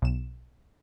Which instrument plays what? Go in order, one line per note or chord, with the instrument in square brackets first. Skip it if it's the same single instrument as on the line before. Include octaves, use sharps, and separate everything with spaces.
[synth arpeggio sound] B1 E7